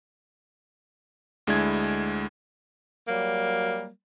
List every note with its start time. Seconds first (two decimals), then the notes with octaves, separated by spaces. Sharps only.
1.47 D2 G#3 D4 E4 G#6
3.08 F#3 G3 A#3